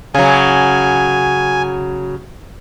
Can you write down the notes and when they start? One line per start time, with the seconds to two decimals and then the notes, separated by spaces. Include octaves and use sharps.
0.15 C#3 F#3 G#5